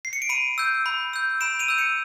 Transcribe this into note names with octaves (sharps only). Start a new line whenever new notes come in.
C7
C#7
D7
B5 C#7 D#7
E6 G6
B5
E6 G6
B5 D7 E7
D#7 F7
E6 G6
C#7 D#7